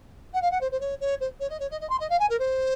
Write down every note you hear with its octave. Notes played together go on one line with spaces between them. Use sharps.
F#5
F5
F#5
C5
C5
C#5
C#5
C5
C#5
D#5
C#5
D#5
D#5
C6
D#5
F5
G#5
A#4
C5